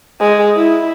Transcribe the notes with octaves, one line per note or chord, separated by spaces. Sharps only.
G#3
E4